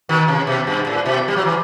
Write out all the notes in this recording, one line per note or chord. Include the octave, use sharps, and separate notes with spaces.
B2 D#3
C3
B2
G2
A2
B2
G3
F#3
E3